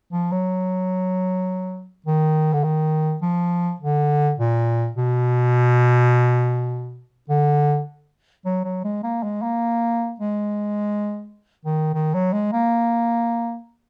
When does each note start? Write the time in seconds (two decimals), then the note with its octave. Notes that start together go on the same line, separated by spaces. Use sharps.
0.12 F3
0.32 F#3
2.06 D#3
2.53 D3
2.64 D#3
3.22 F3
3.80 D3
4.38 A#2
4.97 B2
7.29 D3
8.45 F#3
8.64 F#3
8.84 G#3
9.03 A#3
9.23 G#3
9.42 A#3
10.20 G#3
11.65 D#3
11.94 D#3
12.14 F#3
12.33 G#3
12.52 A#3